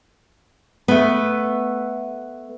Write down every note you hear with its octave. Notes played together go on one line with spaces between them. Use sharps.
A3 B3